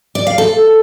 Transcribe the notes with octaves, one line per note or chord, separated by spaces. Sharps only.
D5
F5
A4